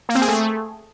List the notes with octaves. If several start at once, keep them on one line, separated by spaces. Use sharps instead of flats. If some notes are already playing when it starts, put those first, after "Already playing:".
A#3
C4
G#4
A3